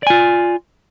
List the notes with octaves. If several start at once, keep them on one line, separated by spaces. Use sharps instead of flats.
F4 D5 G#5